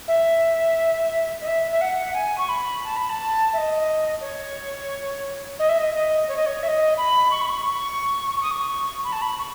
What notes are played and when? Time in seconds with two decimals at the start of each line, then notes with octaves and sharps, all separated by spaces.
0.08 E5
1.41 D#5
1.46 E5
1.71 E5
1.81 F#5
2.14 G#5
2.38 C#6
2.49 B5
2.84 A5
2.97 B5
3.09 A5
3.53 E5
3.58 D#5
4.21 C#5
5.59 D#5
5.69 E5
5.78 D#5
5.94 D#5
6.28 C#5
6.37 D#5
6.46 C#5
6.63 E5
6.67 D#5
6.97 B5
7.31 C#6
7.41 B5
7.49 C#6
7.66 C#6
8.35 C#6
8.43 D#6
8.51 C#6
9.04 B5
9.12 A5
9.21 B5
9.39 C#6